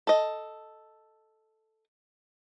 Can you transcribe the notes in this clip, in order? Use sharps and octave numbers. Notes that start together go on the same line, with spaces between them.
A4 D#5